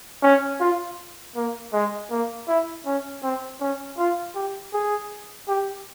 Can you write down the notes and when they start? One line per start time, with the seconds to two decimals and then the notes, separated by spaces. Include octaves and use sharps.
0.23 C#4
0.60 F4
1.36 A#3
1.73 G#3
2.11 A#3
2.48 E4
2.86 C#4
3.23 C4
3.61 C#4
3.98 F4
4.35 G4
4.73 G#4
5.48 G4